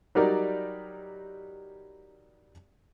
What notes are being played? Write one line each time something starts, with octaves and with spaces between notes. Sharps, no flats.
F#3 G3 D#4 A#4 D5